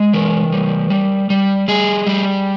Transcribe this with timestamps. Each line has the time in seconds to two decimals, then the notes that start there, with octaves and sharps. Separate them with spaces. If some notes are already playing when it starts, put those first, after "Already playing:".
Already playing: G#3
0.13 E3 A#4
0.52 G3
0.90 G3
1.30 G3
1.68 G3 G#4
2.07 G3